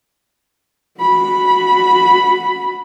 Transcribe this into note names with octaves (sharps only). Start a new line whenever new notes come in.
F#4 B5